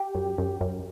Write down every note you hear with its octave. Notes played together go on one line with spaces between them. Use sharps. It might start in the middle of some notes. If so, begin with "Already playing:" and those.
Already playing: G4
F#2
F#2
F#2